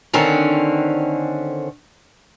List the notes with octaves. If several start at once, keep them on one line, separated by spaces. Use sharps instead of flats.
D3 D#3 C4 C#4